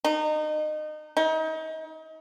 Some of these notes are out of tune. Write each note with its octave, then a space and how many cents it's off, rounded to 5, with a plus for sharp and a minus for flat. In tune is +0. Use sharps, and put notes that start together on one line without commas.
D#4 -25
D#4 +35